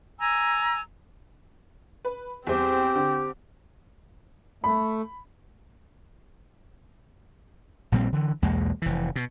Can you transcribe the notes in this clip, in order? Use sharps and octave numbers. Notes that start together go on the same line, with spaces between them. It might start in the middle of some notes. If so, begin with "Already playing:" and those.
G#5 A#5 E6
B4
E2 G3 C4 G4 C5
D3
A3 B5
A#1 A#2 G3 C4
D3 E3
B1 E2 G#3 A#3
F1 E3
B2